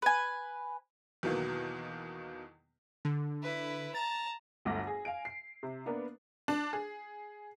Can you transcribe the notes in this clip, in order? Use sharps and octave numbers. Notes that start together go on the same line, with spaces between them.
B4 G#5
E2 B2 D#3 F#3 A#3 B3
D3
E4 B4
A5 A#5 A6
G1 D2 A3 D6 A#6
G#4
F5 G#5 D7
C7
C3
A#3 B3 D4 A#4 B4
D4
G#4